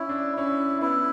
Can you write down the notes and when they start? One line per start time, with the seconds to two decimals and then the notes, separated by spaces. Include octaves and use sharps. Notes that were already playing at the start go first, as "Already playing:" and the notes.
Already playing: C#4 E4
0.09 D4
0.37 C#4 E4
0.82 B3 E4